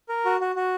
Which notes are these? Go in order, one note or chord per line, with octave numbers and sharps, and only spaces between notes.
A#4
F#4
F#4
F#4